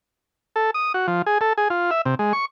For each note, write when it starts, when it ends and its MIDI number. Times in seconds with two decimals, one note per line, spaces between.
0.56 0.71 69
0.74 0.92 87
0.94 1.07 66
1.08 1.22 53
1.26 1.38 68
1.41 1.53 69
1.58 1.68 68
1.70 1.91 65
1.91 2.01 76
2.05 2.15 48
2.19 2.33 56
2.33 2.45 85